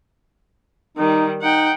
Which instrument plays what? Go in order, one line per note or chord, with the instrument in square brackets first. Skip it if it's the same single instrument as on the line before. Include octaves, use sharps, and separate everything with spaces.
[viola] D#3 G3 [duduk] D#4
[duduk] D#4 [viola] F#5 G5